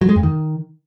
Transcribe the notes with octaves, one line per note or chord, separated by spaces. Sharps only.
F#3
G#3
F2
D#3